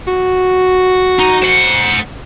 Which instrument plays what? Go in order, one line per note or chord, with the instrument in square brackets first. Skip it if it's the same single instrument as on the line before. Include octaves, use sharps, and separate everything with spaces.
[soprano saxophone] F#4
[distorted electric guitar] D#4
C5 F#5